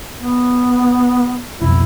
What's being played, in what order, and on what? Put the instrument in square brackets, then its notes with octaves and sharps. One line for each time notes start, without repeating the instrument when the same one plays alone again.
[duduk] B3
[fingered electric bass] F1 B1 F2 [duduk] E4